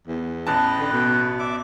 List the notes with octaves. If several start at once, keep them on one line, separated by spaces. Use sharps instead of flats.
E2
A1 B4 D#5 G5 A5
D3
B2
D5 E5 D6